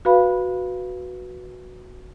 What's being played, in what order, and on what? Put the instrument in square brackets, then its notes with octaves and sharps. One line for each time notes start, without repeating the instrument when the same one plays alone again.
[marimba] F#4 B4 F5 B5